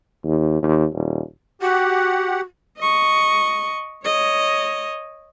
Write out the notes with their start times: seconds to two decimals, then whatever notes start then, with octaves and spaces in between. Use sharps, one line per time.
0.25 D#2
0.62 D#2
0.93 D#1
1.62 F#4 G4 F#5
2.78 D#5 C#6
4.04 C#5 D#5